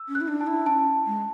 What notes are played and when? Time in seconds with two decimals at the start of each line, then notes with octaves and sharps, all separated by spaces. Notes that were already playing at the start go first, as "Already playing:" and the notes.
Already playing: E6
0.09 C#4
0.15 F#6
0.21 E4
0.28 D4
0.41 A5
0.47 E4
0.66 C#4 A5
1.06 G#3